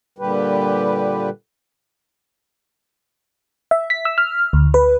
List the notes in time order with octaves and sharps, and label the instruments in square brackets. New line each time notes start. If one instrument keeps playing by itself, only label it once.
[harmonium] A#2 D3 G3 G4 B4
[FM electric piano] E5
B6
E6
F6
D2
B4